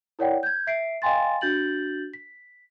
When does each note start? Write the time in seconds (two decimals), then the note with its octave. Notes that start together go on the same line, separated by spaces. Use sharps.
0.19 E4 A#4 C#5 D5 F#5 G5
0.43 G6 G#6
0.67 E5 B6 C7 D7
1.02 D#5 F5 G5 G#5 C6 A6
1.41 D4 F#4 G6 A6 F#7
2.14 B6